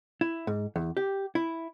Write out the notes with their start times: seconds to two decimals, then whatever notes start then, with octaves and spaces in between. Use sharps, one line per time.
0.21 E4
0.47 G#2
0.76 E2
0.97 G4
1.35 E4